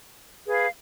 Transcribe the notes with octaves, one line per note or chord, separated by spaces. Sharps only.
G#4 B4 F5